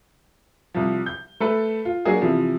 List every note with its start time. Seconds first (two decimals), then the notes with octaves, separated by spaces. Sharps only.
0.74 C2 F3
1.06 G6
1.40 A3 A4 B4
1.85 F4
2.05 F#3 A#3 D4 G#4
2.21 C3 E3 F3